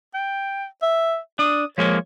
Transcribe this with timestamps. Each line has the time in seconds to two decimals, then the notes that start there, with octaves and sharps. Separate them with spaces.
0.14 G5
0.82 E5
1.39 D4 D#6
1.78 F3 G#3 A#3 C#5